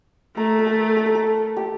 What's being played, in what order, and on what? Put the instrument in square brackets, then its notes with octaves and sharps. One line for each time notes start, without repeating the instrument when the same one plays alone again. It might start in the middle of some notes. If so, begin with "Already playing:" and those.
[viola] A3 [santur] A#4
[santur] A#4
A4
A4
A#4
A4
G4